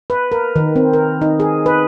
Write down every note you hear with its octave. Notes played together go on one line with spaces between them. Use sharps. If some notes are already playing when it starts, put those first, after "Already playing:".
B4
A#4
D#3
C4
A#4
D#4
G#4
B4